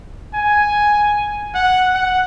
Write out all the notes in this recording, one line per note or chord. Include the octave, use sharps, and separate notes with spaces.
G#5
F#5
F#5